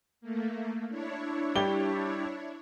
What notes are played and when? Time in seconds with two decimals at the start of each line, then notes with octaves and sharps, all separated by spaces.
0.21 A3 A#3
0.88 D4 E4 C#5
1.55 G3 G4 G7